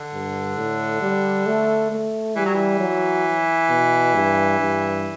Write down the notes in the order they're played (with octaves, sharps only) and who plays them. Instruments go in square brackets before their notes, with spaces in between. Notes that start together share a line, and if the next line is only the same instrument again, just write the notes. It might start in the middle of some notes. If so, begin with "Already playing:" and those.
Already playing: [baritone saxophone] D3
[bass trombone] G2
A2
G3
A3
A3
[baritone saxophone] E3 [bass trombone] G3
[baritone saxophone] F#3
E3
[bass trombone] F#3
B2
G2
G2